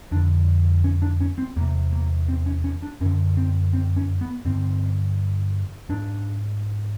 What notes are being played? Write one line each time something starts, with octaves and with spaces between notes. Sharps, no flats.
F2 D3 D4
C#4
D4
C#4
C4
E2 C3 A#3
A#3
C4
C#4
C#4
D4
F#2 D3 C#4
C4
C4
C#4
B3
G2 D3 C4
G#2 D4